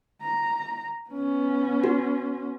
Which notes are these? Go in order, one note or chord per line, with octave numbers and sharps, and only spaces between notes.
A#5
B3 C#4
F#4